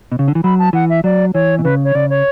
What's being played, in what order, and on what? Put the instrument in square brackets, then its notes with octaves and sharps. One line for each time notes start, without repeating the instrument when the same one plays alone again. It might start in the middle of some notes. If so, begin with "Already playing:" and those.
[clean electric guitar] B2
C#3
D3
E3
[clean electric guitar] F#3 [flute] B5
[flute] A5
[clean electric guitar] E3 [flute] F#5
[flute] E5
[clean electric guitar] F#3 [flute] D5
[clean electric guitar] E3 [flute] C#5
[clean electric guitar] B2
[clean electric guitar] C#3 [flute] B4
[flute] C#5
[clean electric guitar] C#3 [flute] D5
[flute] C#5